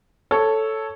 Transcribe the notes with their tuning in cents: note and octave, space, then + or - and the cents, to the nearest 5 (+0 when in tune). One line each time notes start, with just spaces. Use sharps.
A4 +0 C#5 +0